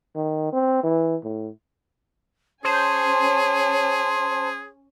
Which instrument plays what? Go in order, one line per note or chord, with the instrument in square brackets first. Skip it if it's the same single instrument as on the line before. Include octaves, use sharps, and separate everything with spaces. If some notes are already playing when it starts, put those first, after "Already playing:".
[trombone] D#3
C4
E3
A2
[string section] C#4 G#5 [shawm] G#4 [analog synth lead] C5 [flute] A5